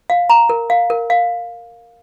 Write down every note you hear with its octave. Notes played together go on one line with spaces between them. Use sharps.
F5
A#5
A#4
F5
A#4
F5